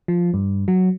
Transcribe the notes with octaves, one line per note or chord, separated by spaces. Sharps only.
F3
G2
F#3